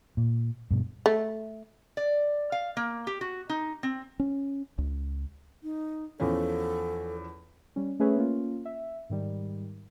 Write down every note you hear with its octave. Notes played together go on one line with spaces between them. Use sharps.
A#2
G2 B2
A3
D5
F5
A#3
G4
F#4
D#4
C4
C#4
C#2
D#4
E2 F3 C#4 A4
G3 C#4
A3 C#4 G#4 B4 C#5 E5
A#3 C#4 F4
E5
G#2 D#3 G3